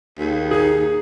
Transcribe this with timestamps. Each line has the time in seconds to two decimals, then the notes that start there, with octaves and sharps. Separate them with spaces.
0.19 D#2 G#4
0.51 D#4 G#4